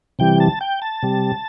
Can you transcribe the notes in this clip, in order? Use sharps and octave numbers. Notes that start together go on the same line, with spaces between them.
C3 E3 G3 G5
A5
G5
A5
C3 G3